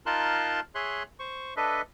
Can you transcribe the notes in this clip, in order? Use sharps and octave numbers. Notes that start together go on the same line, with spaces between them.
D#4 F4 A#4 A5 C6 F#6
G#4 C#5 E5 C6 F#6
C5 C#6
D4 A4 B4 D#5 E5